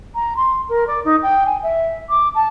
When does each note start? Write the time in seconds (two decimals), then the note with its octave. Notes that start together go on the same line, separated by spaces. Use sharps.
0.14 A#5
0.36 C6
0.68 A#4
0.87 D5
1.04 D#4
1.22 G5
1.46 G#5
1.62 E5
2.09 D6
2.34 A5